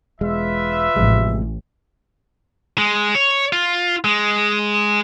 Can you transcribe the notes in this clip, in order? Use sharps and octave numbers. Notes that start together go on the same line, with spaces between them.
E1 G#3 F4 B4 E5
A1 C3 F3 G#3
G#3
C#5
F4
G#3